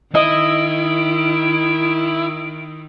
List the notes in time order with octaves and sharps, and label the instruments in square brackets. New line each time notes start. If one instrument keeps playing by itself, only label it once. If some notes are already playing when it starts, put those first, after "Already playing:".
[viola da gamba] D#3 [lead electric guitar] E4 [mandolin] D#5 [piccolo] D7